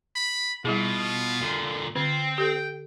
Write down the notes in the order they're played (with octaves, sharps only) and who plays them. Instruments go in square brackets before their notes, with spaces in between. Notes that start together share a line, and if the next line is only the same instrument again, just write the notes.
[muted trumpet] B5
[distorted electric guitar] B2 [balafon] G3 E4 G#4 [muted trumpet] F4
[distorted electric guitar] A#2 D3
[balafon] D3 [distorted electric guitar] C4 [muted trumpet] F4
[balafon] G4 A4 [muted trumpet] G5